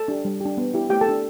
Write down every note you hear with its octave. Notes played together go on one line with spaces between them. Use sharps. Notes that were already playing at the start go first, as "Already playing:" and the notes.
Already playing: A4 A5
D4 G4
G3
D4 G4
B3
E4 G4
A3 G4 G5
A4 A5
D4 G4